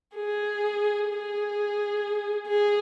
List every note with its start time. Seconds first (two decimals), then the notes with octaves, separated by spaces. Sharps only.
0.16 G#4
1.08 G#4
2.48 G#4